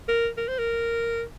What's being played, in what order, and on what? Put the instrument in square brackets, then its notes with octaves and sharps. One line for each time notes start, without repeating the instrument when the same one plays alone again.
[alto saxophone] A#4
A#4
C5
A#4